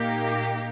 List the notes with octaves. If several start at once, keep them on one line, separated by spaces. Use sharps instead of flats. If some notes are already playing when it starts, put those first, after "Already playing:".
Already playing: A#2 A#3 D#4 G4